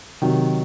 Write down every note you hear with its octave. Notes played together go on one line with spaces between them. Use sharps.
C3 D#3 F#3